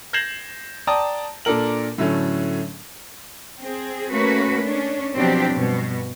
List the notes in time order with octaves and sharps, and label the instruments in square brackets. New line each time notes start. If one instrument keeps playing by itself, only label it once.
[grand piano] G6 G#6 A#6 C7 E7 F#7
D5 G5 A5 A#5 D#6
A#2 D4 A4 A#4 F#7
A2 D3 F#3 A3 C#4
[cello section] C4 G#4
A3 A#3 C#4 F#4 B4
C#4 D4
B2 F3 F#3 C4 D4 G4
G2 B2